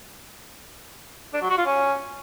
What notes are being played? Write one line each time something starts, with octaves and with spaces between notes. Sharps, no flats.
D4
F#3
F#4
F4
C#4